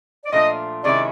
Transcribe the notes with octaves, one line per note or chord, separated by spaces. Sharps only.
D5
A#2 F3 A3 D4 F4 D#5
C3 D#3 G#3 C#4 E4 D5